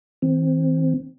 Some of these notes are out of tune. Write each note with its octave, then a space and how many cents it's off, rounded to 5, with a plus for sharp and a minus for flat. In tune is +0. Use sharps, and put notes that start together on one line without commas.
E3 -45 C4 +0